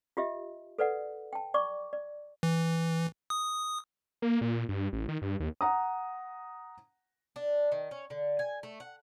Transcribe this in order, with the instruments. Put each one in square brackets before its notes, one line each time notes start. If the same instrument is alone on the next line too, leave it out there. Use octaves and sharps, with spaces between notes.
[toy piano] F4 G4 D#5 E5
A4 B4 D5 F#5
G5 A5
D5 C#6 D6
D5
[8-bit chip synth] E3
D#6
[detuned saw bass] A#3
A#2
G2
A1
D#3
G2
D#2
[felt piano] F#5 A#5 D#6
[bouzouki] D4
D#3
C#4
D3
G#5
A3
F#5